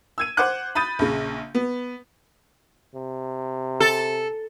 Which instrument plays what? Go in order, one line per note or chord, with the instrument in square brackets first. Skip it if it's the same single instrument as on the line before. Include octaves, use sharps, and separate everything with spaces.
[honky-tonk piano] E6 G#6 D#7
C5 F#5 D6 F#6
B5 D#6 G6 A6 D#7
A#1 C#3
B3
[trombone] C3
[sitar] A4